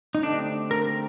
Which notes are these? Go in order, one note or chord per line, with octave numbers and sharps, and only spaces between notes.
D#4
D3 A3 C4 D4 G4
A#4